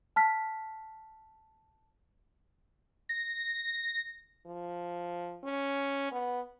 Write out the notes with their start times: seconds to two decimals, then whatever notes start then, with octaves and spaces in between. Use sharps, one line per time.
0.16 A5 F6 B6
3.09 A#6
4.46 F3
5.44 C#4
6.11 B3